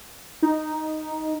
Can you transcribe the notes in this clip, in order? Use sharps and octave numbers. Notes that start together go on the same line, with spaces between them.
D#4